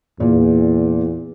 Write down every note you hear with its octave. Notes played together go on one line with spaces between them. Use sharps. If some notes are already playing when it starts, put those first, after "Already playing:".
E2 A#2